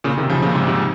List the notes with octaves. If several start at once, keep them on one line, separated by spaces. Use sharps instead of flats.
A#2 C#3
C3 D#3
C#3 F3
A#2 C#3
G#2 C3
G#2 C3